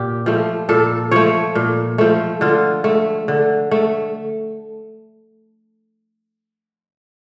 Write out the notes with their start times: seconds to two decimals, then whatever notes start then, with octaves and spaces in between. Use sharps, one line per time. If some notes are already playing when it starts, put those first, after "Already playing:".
Already playing: A#2 G4
0.26 F3 A3
0.69 A#2 A4
1.11 F3 A3 C#5
1.55 A#2
1.98 F3 A3
2.41 D3 F4
2.84 A3
3.28 D3
3.71 A3